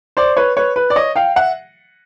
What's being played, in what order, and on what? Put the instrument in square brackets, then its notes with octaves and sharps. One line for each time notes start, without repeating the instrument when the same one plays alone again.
[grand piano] C5 D5
B4 C#5
B4 C#5
B4
D5
C#5 D#5
F5 G5
E5 F#5